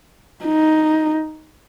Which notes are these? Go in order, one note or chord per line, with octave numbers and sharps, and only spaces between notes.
D#4